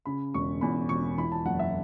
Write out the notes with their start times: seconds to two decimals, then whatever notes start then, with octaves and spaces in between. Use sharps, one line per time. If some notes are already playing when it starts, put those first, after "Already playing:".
0.06 C#3 B5
0.34 E1 C#6
0.61 E2 B5
0.89 E1 C#6
1.18 E3 B5
1.32 A5
1.45 F#1 F#5
1.59 E5